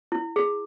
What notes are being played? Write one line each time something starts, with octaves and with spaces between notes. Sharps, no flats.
E4
G#4